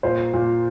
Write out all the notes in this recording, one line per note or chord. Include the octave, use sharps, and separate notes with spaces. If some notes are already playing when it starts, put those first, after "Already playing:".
A#2 C5
A#2